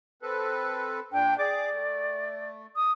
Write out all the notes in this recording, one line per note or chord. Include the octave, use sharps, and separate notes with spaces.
C4 A4 B4
A#2 D4 G5
G#4 D5 D6
A3
D#6